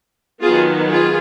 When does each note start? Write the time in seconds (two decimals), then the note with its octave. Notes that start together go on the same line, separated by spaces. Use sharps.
0.42 D#3 F#3 B3 F4 G#4
0.89 F4 G#4